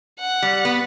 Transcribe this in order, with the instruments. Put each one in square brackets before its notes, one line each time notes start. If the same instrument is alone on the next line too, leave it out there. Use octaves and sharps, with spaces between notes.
[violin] F#5
[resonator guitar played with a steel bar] G3
B3